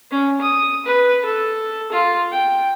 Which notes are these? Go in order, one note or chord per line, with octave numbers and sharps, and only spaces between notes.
C#4
D#6
B4
A4
F4
G5